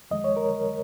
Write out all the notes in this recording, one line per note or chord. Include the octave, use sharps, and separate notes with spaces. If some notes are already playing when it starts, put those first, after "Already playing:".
F2 D#3 G#3 D#5
C#5
A#4